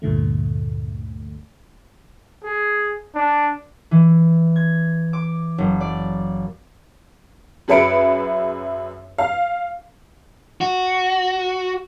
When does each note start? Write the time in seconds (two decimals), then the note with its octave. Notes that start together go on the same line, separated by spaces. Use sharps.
0.02 D2 G2 A#2 D3 A3
2.44 G#4
3.15 D4
3.91 E3
4.56 G#6
5.13 D6
5.58 F#1
5.80 D5
7.68 F#2 G#4 B4 E5 C#7 D7
9.18 F5
10.61 F#4